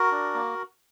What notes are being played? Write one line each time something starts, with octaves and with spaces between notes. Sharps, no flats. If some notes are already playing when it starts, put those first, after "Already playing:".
Already playing: F#4 A#4
D4
A#3